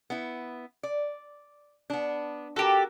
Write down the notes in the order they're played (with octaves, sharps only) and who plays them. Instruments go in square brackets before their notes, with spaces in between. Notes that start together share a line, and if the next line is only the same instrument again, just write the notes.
[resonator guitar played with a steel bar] B3 E4
D5
B3 D4
[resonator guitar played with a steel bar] F#4 A#4 [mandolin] G4 A4